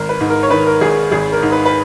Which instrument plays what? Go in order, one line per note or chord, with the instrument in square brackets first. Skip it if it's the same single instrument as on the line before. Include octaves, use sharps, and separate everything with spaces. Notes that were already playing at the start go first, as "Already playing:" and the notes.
Already playing: [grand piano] G#1 A#4
B4
G#2
A#4
C#5
D#3 B4
A#4
G#1 G#4
G#1 G#4
A#4
G#2
B4
B4